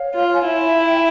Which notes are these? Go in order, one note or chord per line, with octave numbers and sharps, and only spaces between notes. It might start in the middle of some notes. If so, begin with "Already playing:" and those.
Already playing: C#5 F5
F4
G#5
E4 E5 G5